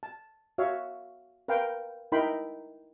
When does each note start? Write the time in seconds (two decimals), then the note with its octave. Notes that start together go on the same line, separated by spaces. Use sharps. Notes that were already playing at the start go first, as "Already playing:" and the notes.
0.03 A5
0.58 F#4 C#5 E5 F5
1.48 A#4 B4 F5 G5
2.12 D#4 E4 A#4 G5 B5 C6